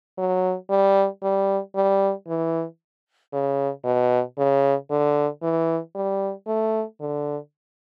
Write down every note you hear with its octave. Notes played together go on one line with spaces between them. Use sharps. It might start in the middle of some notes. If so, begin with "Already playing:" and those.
F#3
G3
G3
G3
E3
C#3
B2
C#3
D3
E3
G3
A3
D3